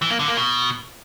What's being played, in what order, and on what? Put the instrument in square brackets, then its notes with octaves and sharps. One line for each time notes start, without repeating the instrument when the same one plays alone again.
[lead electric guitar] E3
A#3
D3
A#3
B2